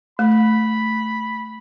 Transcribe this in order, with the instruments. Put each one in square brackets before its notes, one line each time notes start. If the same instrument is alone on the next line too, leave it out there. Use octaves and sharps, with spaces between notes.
[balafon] A3 [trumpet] B5